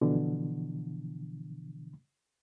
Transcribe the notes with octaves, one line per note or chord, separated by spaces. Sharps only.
B2 D3 E3 F3